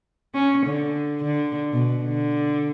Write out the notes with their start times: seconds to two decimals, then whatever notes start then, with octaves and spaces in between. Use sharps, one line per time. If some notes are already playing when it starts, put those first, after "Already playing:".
0.34 C#4
0.65 D3
1.23 D3
1.72 B2
2.03 D3